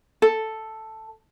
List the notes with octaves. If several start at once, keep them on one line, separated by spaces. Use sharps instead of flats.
A4